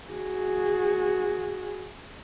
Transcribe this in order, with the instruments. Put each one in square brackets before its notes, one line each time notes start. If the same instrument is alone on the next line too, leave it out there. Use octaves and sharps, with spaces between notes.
[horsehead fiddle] F#4 G#4